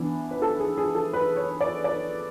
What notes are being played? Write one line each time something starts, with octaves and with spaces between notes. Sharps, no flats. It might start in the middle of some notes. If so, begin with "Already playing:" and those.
Already playing: E3 B3 D4
B4
A4
G#4
G#4
A4
B4
C#5
D5
D5